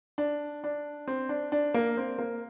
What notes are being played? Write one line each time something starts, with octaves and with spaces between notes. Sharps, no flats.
D4
D4
C4
D4
D4
A#3
C4
A#3